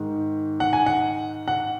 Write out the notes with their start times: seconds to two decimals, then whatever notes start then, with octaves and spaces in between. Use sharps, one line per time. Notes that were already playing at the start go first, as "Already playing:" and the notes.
Already playing: G#2 D#3
0.60 F#5
0.73 G#5
0.86 F#5
1.48 F#5